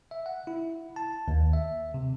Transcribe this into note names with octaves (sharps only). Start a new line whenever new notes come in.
E5
F#5
E4
A5
D#2
E5
C3